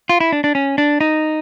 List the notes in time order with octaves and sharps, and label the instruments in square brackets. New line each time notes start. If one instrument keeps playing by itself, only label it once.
[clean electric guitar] F4
E4
D4
D4
C#4
D4
D#4